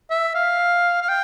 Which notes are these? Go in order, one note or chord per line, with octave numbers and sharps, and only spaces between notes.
E5
F5
F5
G5